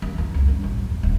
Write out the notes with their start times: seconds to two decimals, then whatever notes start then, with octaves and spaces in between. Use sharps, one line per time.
0.02 D#2
0.18 F2
0.34 C#2
0.48 G2
0.64 A1
0.78 F#3
0.90 E2
1.03 D#1